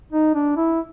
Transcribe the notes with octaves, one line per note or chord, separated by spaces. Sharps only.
D#4
D4
E4